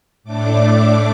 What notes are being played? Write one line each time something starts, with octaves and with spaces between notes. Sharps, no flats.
A2 A3 D4 D6